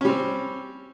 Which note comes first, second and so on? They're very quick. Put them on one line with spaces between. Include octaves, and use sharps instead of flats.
C#4 G3 C4